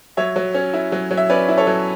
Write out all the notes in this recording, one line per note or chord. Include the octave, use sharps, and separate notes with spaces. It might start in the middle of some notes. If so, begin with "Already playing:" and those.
F#3 C#5 E5
F#3
C#4
E4
F#3
F#3
E5
C#4 B4 D5
E4
A4 C#5
F#3